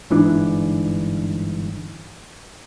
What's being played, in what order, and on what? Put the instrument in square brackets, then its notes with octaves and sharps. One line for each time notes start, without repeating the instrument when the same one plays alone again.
[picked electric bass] G1 G#2 E3 D4